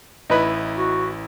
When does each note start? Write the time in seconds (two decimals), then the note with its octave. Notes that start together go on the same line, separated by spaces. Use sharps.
0.30 A1 D#4 E4 B4
0.78 F#4